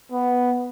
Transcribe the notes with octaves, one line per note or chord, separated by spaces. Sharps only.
B3